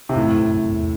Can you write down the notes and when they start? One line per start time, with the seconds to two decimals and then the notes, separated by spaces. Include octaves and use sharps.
0.09 C3
0.15 F#2 A2
0.34 F#2
0.53 F#2
0.72 E2